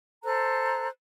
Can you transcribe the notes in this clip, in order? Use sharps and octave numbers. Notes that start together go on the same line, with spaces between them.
A4 C5 A#5 F#6